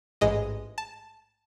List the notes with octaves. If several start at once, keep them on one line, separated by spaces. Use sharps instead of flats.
A1 G#2 E3 G#3 D#5
A5